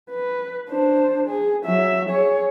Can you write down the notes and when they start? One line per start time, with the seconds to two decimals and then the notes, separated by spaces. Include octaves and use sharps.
0.11 B4
0.69 D4 C5
1.27 G#4
1.65 F#3 E5
2.09 G#4 C#5